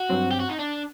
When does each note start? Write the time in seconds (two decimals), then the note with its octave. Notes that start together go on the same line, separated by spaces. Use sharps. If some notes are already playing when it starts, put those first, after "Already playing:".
Already playing: F#4
0.09 G2 F#3 C4
0.31 G4
0.40 F#4
0.50 D#4
0.59 D4